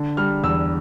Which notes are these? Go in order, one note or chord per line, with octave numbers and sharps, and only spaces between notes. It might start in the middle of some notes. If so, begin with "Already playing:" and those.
Already playing: D3
G3 F6
E2 E6